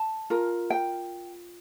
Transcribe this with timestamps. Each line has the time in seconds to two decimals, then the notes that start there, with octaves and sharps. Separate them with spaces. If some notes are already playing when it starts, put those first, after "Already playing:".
Already playing: A5
0.30 F4 A#4
0.70 G5